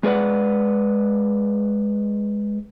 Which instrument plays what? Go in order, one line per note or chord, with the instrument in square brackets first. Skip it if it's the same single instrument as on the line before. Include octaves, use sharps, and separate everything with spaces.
[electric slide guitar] G#3 G#4 B4 D5 F#5